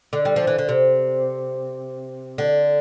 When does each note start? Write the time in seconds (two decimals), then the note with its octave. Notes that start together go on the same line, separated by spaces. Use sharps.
0.13 D3
0.25 G3
0.36 F3
0.47 E3
0.58 D3
0.69 C3
2.38 D3